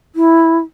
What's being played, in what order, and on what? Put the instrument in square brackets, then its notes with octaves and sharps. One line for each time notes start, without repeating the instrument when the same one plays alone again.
[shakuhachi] E4